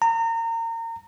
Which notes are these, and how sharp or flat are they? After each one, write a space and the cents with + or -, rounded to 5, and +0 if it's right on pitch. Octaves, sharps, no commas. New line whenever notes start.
A#5 -30